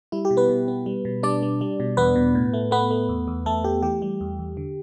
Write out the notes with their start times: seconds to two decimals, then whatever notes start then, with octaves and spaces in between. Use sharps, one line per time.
0.12 G3 E4
0.25 G4
0.31 B2
0.37 B3 B4
0.49 B2
0.68 B3
0.86 G3
1.05 B2
1.23 G3 D4 D5
1.43 G3
1.61 G3
1.80 B2
1.97 E2 B3 B4
2.16 B2
2.35 A2
2.53 A3
2.71 A3 B3 B4
2.91 A3
3.09 E2
3.27 E2
3.46 E2 A3 A4
3.64 A3 G4
3.82 E3 G4
4.02 G3
4.21 E2
4.39 E2
4.57 D3